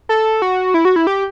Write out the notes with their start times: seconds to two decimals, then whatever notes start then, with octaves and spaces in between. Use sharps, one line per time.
0.09 A4
0.42 F#4
0.74 E4
0.85 F#4
0.96 E4
1.07 G4